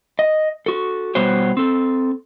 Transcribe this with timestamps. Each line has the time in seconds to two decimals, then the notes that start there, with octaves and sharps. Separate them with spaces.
0.19 D#5
0.66 F#4 A4
1.15 B2 G3 B3 F#4 C5 C#5
1.57 C4 A4